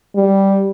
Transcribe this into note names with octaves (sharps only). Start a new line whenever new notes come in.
G3